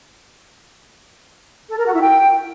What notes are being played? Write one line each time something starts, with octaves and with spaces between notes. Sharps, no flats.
A4
A#4
F#4
E4
G5